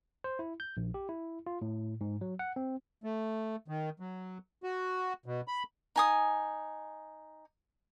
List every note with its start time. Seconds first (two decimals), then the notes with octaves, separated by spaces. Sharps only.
0.24 C5
0.39 E4
0.60 G6
0.77 A#1
0.94 G4
1.09 E4
1.47 F4
1.62 A2
2.01 G#2
2.21 F#3
2.39 F#5
2.56 C4
3.04 A3
3.68 D#3
4.00 F#3
4.63 F#4
5.26 B2
5.48 B5
5.96 D#4 G#5 D#6